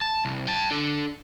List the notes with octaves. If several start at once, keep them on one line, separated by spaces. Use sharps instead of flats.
A5
C2
G5 A5
D4 A4